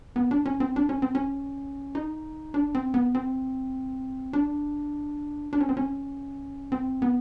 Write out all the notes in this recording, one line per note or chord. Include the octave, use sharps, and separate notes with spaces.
B3
D4
C#4
C4
D4
C#4
C4
C#4
D#4
D4
C4
B3
C4
D4
D4
C#4
C4
C#4
C4
B3